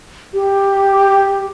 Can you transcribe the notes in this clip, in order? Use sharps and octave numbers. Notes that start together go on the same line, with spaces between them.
G4